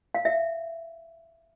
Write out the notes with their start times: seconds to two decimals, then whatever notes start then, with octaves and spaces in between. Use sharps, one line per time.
0.14 F5
0.25 E5